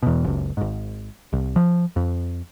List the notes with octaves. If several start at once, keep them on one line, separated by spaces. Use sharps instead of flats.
E2 B2
F#1 C#2
G#1 G#2
C2
F3
F2